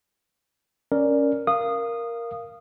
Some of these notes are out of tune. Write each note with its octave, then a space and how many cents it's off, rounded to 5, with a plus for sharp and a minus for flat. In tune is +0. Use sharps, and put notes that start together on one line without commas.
C#4 +0 A#4 +0 D5 +0
A#4 +0 F5 -15 D#6 -15